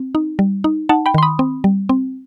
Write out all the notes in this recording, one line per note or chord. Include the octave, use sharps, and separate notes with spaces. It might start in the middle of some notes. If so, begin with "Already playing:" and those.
Already playing: C4
D#4
G3
D#4
D#4 F#5 A5
G5 B5
D#3 C6
B5 D#6
C4
G3
C4